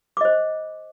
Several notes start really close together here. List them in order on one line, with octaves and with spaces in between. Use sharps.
D6 D#5 C5